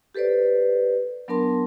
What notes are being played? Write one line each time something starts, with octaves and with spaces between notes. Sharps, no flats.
G4 A4 B4 C5 D5
F#3 B3 D4 A#4 A5 C6